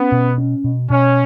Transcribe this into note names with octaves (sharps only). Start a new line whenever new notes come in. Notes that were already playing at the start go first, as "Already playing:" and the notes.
Already playing: B3 C#4
B2
C#4
B2
B2 C#4